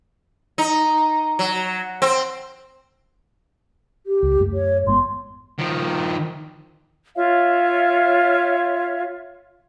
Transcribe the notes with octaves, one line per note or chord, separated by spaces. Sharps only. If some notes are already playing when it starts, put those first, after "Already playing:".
D#4
F#3
C4
G4
C#2
F#2 A3
C#5
G#1 G#3 B3 C6
D#3 F3
F4 C#5 E5 F5